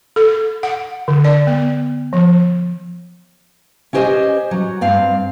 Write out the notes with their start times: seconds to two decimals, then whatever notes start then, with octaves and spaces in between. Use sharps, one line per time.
0.16 A4
0.63 F#5
1.08 D3
1.25 D5
1.47 B3
2.13 F3
3.93 C#4 E4 G4 C5 D#5 G#5
4.51 F#3
4.81 G2 C4 F5